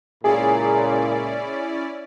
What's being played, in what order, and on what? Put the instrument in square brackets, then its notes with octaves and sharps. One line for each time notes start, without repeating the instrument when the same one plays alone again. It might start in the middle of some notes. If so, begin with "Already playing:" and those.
[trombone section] C#2 A#2 [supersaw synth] C#4 E4 D5 [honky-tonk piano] G#4